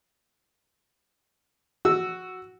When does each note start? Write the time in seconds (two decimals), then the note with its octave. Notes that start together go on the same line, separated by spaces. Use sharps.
1.85 F#4 E6